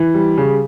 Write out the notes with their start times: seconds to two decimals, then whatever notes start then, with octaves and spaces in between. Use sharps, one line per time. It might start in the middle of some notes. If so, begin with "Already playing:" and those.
Already playing: E3
0.14 G3
0.38 C#3